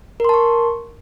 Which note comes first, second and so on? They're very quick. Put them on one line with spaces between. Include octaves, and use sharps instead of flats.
A#4 C6 A5 C#6